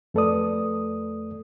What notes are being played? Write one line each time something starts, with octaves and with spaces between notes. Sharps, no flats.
F2 A3 A4 B4 D5 D#6